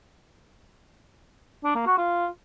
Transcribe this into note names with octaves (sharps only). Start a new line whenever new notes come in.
D4
A#3
F#4
F4